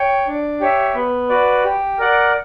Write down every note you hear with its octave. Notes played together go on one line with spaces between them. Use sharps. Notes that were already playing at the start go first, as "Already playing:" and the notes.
Already playing: C#5 G5
D4
G4 C#5 E5
B3
F#4 B4 D5
G4
A#4 D5 F#5